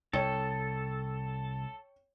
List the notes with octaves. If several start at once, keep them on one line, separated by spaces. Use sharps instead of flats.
C2 A4 C#5 G5